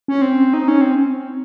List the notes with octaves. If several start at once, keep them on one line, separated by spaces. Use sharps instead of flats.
C#4
C4
D#4
C#4
C4